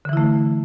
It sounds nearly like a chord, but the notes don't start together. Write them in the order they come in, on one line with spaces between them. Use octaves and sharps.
D3 E3 E4 A3